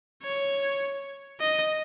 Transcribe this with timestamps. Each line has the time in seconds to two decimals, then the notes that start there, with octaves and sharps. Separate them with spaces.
0.23 C#5
1.41 D#5